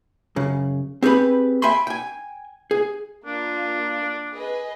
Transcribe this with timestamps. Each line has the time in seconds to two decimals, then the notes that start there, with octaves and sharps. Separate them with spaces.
0.36 F#2 C#3
1.03 C4 G4 G#4 B4 B5
1.62 E5 G5 G#5 B5 C6
1.87 G5 G#5
2.71 G#4
3.26 A#3 D4 F4
4.33 G#4 B4 D#5